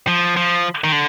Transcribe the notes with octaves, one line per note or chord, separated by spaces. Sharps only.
F3
F3
D#3
D3